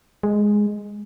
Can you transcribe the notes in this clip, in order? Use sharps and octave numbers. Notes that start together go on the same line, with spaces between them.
G#3